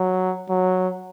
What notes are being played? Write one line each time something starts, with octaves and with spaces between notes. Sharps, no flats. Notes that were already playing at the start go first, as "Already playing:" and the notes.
Already playing: F#3
F#3